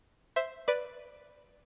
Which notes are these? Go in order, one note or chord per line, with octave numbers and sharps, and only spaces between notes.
C5 E5
B4 D5